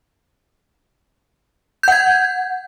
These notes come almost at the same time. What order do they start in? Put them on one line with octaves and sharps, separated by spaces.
G6 F#5 G#6